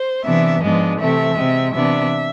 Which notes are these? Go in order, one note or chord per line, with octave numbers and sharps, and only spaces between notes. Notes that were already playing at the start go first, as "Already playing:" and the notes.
Already playing: C5
C3 E3 B3 D4 E5
G#2 F3 G#3 B3 D4
C3 E3 A3 C4 E5
C3 G#3 C4
C3 E3 B3 D4 E5